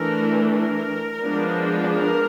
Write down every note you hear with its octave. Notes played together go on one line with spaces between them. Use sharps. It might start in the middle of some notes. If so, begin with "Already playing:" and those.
Already playing: E3 A3 D4 A#4
A#4
F3 G#3 B3 D4
A#4